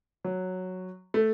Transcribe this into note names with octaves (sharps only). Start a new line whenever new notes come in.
F#3
A3